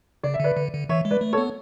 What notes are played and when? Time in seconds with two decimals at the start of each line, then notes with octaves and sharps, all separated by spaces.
0.23 C#3 D5
0.34 E5
0.40 D3 B4 D5
0.57 D3
0.73 D3
0.89 E3 C#5 E5
1.05 G#3
1.11 B4 D5
1.21 A3
1.33 A4 C#5
1.38 B3